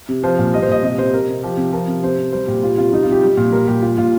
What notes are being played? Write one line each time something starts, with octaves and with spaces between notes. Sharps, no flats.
C3
F3 C5
A#2
G3 D#5
C5
A#2 D#5
C3 D#5
C3 C5
C3 A#4
C3
F3 G4
C3
F3 A#4
C3
C3 C5
C3
G3 C5
A#2 G4
G3 F4
C3 F4
G3 D#4
F4
C3
G4
G3
A#2
G3 A#4
A#2 G4
G3 F4
A#2 F4